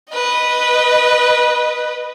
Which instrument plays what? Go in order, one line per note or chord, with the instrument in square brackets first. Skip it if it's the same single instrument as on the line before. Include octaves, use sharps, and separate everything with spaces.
[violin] B4 D#5